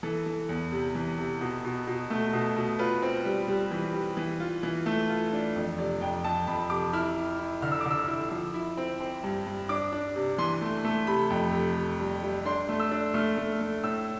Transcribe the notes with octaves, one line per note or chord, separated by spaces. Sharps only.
E3 A4
E3
E2
C3
E3
C3
B2
B2
B2
A3
B2
B2
F4 B4
C4
G3
G3
E3
G3
E3
F4
E3
A3
F4
D4
F2
C3 D5
F2 G5
F2 A5
F2 B5
C3 D6
E4 F6
E4
E4
D3 F6
E6
D6
D3
E6
E4
F3
E4
C4
C4
G2
G2
D4 D6
D4
C3
E3 C6
A3
A3
C3 B5
F2
C3
C3
G3
G3
D4 C6
A3
E6
D4
A3 F6
A3
A3
A2 E6